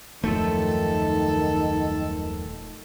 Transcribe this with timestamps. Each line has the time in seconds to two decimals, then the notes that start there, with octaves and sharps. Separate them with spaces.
0.24 D#1 F#2 D#3 F3 A3 A4